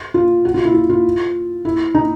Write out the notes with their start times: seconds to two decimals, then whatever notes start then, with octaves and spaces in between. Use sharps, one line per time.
0.14 F4
0.45 F#4
0.54 F4
0.65 E4
0.74 F4
0.90 F4
1.65 E4
1.95 D#4